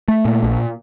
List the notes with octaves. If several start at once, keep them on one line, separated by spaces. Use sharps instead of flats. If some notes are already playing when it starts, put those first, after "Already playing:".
A3
A#2
A#1